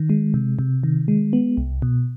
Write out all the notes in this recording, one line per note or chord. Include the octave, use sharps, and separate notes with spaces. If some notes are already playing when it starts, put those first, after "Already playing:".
Already playing: D#3
G#3
C3
C3
D#3
G#3
B3
C2
B2